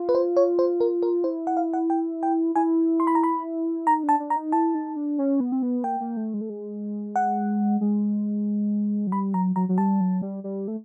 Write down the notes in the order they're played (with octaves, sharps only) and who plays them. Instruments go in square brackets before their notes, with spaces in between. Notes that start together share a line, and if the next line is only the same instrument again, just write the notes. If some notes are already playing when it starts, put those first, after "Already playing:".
Already playing: [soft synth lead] F4
[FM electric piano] B4
C5
C#5
C5
A#4
A#4
[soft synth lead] E4 [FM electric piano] C5
[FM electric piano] F#5
F5
F#5
G5
G5
[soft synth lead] E4 [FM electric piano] G#5
[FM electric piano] C6
B5
A#5
B5
[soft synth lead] D#4 [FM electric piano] A#5
[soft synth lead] D4
[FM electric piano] A5
[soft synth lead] D4
[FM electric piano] A#5
[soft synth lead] D#4
[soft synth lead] E4 [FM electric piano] A5
[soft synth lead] D#4
D4
C#4
B3
C4
B3
[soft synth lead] A#3 [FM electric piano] G5
[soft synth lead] A#3
A3
G#3
A3
G#3
[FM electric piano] F#5
[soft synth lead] G#3
F#3
[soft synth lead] G3 [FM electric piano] B5
[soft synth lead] F#3 [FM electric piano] A#5
[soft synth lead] F#3 [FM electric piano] A#5
[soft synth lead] F#3
[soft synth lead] G3 [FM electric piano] A5
[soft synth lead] F#3
G3
G3
A3